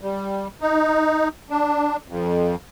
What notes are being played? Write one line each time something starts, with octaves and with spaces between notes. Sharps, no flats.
G3
D#4
D4
F2